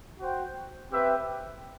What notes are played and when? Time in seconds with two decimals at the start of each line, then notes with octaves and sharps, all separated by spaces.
0.18 F#4 C5 G5
0.90 C4 G4 B4 E5 G5